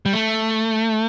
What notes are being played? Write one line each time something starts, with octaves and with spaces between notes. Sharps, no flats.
G3
A3